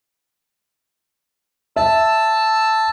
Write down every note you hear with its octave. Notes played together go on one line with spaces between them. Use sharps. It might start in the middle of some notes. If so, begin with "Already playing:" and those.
E5 A5 E6